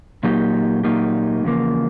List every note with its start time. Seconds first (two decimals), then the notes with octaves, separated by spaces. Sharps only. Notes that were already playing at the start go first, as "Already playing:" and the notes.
0.23 A#2 F#3 A#3 D#4 G4
0.83 A#2 F#3 A#3 D#4 G4
1.44 E2 C#3 F3 A#3